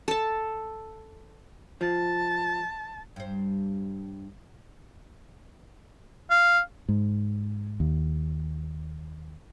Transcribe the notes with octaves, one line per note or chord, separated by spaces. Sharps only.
A4 A5
F3 A5
G2 C5
F5
G#2
D#2